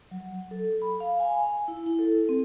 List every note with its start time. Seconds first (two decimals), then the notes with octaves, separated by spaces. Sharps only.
0.11 F#3
0.51 A4
0.82 B5
1.00 F5
1.20 G#5
1.68 E4
1.86 E4
1.99 A4
2.29 C4